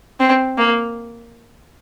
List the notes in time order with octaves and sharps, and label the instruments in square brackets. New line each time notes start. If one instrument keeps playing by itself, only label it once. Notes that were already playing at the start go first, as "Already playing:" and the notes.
[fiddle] C4
A#3